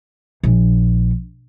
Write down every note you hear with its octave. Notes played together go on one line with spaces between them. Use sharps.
A#1